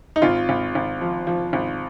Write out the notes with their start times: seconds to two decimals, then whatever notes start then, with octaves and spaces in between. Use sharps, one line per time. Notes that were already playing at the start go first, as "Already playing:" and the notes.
0.16 D#4
0.22 G#1 F4
0.49 G#1
0.75 G#1
1.01 F3
1.27 F3
1.53 G#1